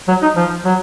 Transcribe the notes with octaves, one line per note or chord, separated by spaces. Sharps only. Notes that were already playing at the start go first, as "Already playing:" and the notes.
F#3
D#4
F3
F#3